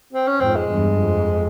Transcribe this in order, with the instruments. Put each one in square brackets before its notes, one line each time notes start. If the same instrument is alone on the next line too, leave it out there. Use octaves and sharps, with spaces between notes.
[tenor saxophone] C4
C#4
[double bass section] F2 G#2 [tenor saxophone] C4
[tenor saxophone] G#3
[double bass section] E2 G2
F2